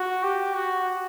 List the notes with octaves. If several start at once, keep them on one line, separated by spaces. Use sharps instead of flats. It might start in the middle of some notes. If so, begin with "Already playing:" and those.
Already playing: F#4
G4
F#4